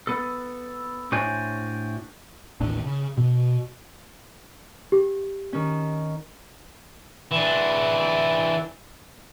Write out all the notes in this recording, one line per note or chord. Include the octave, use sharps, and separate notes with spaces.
B3 A4
A2 D4 F#4 C5 C#5 G#5
A1 D#2 A2 D4
C#3
B2
G4
D#3 C#4
E3 D4